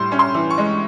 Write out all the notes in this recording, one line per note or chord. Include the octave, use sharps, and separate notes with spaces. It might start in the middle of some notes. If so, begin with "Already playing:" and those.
Already playing: A2 G3 C6
C#4
C6
E3
C#6
G#3